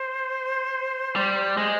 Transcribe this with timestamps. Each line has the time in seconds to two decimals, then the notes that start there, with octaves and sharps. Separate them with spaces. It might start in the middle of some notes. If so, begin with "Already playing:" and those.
Already playing: C5
1.16 G3
1.57 G#3